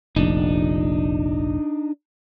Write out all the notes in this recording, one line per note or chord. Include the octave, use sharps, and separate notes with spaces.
F1 A#1 D4 D#4